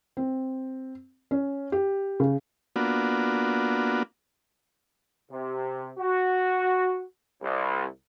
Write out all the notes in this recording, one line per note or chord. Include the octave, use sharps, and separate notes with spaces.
C4
C#4
G4
C#3
A#3 B3 D4 F4 F#4
C3
F#4
C2